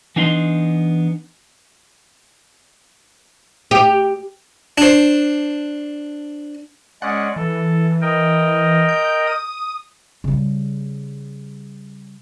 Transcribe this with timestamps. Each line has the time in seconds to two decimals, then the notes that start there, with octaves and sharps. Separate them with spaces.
0.16 E3 B3 D4 D#4 F#5 C6
3.71 G4
4.78 D4 C5
7.02 G#3 C#4 D5 F#5
7.36 E3 A4
8.02 A#4 D#5 G5
8.89 G6
9.27 D#6
10.24 C#3 G3